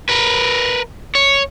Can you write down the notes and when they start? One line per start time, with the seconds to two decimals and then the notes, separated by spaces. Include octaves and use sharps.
0.09 A#4 B4
1.15 C#5